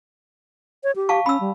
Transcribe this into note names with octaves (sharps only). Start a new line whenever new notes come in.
C#5
G4
F5 A5 C#6
C#4 B5 E6
G3